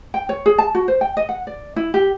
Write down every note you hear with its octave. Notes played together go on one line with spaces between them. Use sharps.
G5
C#5
G#4
A5
F#4
C5
G5
D#5
F#5
D5
E4
G4